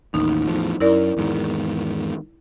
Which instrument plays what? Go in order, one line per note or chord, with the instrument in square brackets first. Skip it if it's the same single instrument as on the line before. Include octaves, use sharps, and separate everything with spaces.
[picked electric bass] A1 D#2 [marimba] D#4
[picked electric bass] E2 A2 F3
[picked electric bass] F#2 [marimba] E4 A#4 D5
[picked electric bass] E2 G#2 D#3